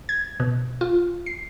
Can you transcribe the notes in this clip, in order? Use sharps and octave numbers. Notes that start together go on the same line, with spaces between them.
G#6
B2
F4
C7